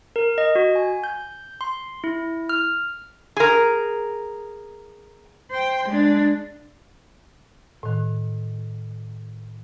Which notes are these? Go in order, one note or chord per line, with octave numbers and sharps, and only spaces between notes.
A#4
D#5
F#4
G#5
G6
C6
E4
F6
G#4 A#4
C5 G5
G#3 D4
A2 D#3